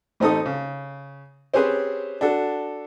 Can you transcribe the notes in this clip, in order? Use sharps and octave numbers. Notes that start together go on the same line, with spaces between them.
A1 C4 D#4 A4 D#6
C#3
C4 C#4 G4 G#4 B4 C5
D4 F#4 A4